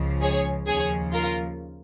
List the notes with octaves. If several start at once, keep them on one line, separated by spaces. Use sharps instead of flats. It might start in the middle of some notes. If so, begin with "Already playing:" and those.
Already playing: C#2 C#3 F3
G#4 C#5
D#2 C#3 F3 G#4 C#5
F4 A#4